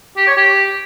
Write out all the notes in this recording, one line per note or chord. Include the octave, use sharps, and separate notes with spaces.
G4
C#5
G4